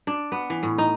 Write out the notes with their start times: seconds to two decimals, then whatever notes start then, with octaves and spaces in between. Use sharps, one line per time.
0.07 D4
0.32 B3
0.50 E3
0.63 A2
0.78 D#4